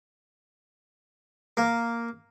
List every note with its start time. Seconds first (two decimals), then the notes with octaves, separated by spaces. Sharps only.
1.57 A#3